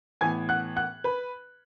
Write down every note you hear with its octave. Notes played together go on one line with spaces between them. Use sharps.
A2 E3 B3 G#5 G#6
F#5 F#6
F#5 F#6
B4 B5